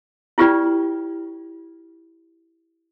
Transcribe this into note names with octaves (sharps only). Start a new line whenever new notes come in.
E4 F4 G4 B4 D5 G5